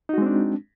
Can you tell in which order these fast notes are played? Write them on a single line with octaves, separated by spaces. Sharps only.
D#4 F#4 G#3 C4 D4